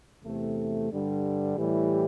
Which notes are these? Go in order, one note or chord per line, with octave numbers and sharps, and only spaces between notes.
E2 C3 A3
G2 D3 G3
A2 E3 G3 G4